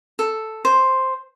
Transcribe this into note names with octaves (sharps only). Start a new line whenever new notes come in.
A4
C5